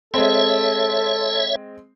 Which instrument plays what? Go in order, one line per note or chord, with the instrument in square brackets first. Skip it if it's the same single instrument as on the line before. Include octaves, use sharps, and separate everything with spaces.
[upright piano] G#3 C4 [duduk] A4 [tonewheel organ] C#5 E5